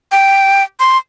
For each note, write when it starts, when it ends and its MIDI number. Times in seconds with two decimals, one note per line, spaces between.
0.12 0.63 79
0.80 0.97 84